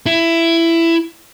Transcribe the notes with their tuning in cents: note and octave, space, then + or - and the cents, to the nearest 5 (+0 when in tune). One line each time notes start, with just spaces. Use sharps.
E4 +15